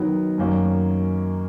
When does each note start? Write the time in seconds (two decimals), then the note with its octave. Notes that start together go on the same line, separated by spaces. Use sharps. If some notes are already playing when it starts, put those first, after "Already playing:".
Already playing: D#3 F#3 B3
0.38 F#2 D#3 F#3 A#3 C#4